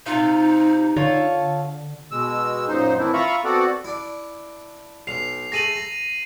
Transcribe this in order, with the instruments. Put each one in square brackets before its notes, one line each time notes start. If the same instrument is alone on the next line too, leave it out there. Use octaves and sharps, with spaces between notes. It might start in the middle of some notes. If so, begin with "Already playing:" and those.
[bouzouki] C3 F4 [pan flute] D#4
[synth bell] D3 [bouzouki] F4 A4 C#5
[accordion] B2 G#3 E6
F#2 A#2 D#4 C5
A2 D#3 E3 C4 D4 E4
F4 E5 F5 A#5 B5 C#6
B3 C4 F#4 A4 D5 F#5
[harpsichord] D4 E4
[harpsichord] B1 [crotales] C7 F7
[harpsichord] A3 G#4 A4 [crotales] A#6 D#7 F#7
[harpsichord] A#5